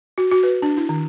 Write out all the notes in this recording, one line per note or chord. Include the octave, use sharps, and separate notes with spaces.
F#4
F#4
B4
D4
E4
D#3